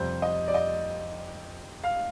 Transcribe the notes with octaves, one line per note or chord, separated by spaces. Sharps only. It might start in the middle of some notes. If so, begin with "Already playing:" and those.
Already playing: F2 C3 G3 C5
D#5
D5
D#5
F5